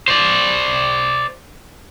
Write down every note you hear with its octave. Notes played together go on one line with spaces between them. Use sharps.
C5 D5